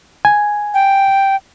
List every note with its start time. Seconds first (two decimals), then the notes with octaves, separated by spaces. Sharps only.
0.25 G#5
0.74 G5